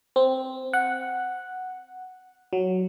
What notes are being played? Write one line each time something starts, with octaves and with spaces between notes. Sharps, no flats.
C4
F#5
F#3